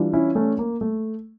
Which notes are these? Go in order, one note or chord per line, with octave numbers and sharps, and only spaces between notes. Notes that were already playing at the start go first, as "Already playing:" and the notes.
Already playing: E3 G3 D4 F4
C#4 E4
A3 C#4
A#3
A3